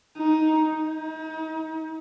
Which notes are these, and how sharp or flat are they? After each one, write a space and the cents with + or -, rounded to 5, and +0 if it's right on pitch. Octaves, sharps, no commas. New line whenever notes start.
D#4 +5
D#4 +40